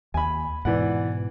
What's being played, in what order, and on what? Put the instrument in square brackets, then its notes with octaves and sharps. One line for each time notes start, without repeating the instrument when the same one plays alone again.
[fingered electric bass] D#2 [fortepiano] G#5 B5
[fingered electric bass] G#2 B2 [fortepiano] E3 D5 F#5